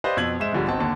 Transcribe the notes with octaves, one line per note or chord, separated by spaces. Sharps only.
G4 B4 C5 D5 D#5 F5
F2 B2 E6 G#6 F#7
G#2 G#3 C5 E5 E7
B1 G#2 D3 F3 G3
G1 C4 D#4 F#4 A5
D#2 D3 A5